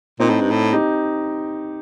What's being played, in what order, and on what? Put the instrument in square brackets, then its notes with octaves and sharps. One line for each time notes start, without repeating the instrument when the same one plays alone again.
[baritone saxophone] A#2 [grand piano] C4 D#4
[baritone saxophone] A2
G2
A2
[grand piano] D#4 G4